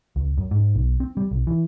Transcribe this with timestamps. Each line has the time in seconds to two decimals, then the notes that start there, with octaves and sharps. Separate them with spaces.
0.16 C#2
0.38 F#2
0.51 G#2
0.75 B1
1.00 C4
1.17 G3
1.31 B1
1.47 E3